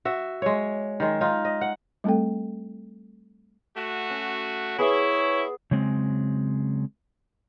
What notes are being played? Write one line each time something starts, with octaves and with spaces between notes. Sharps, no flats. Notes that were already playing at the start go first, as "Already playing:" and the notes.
F#4 E5
G#3 C#5
D#3 G#3
D#4 F4
D#5
F#5
G3 A3 C4 A4 G5
A3 F#4
C#4
B3 E4 G#4 C#5 D6
C#3 F#3 G#3 C4